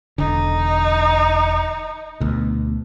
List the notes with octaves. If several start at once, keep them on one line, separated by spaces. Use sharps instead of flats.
E1 D3 D#4
D2 B2